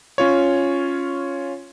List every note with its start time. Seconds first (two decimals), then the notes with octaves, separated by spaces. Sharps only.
0.18 C#4 F4 C#5